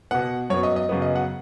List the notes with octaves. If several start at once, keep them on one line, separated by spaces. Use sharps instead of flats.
B2 B3 F#5
F#2 F#3 B3 C#5
D#5
D#5
F#2 C#3 B3
D#5
F#5